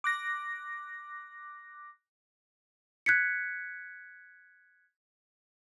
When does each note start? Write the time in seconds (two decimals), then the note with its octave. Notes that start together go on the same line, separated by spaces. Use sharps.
0.04 D6 F#6 A#6
3.06 F#6 G#6 B6 C#7